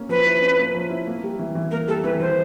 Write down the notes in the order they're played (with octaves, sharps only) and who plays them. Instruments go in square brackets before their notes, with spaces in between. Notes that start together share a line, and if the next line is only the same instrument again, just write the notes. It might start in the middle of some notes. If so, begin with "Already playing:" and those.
Already playing: [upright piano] A#3 C#4
[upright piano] F3 [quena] B4
[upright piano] E4
C#4
A#3
F3
E4
A#3
G3
E3
E3
[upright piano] A#3 [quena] A#4
[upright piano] G3 [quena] A4
[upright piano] E3 [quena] B4
[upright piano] E3 [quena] C5